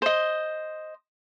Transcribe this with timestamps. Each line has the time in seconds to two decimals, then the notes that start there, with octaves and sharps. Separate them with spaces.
0.02 C5 D#5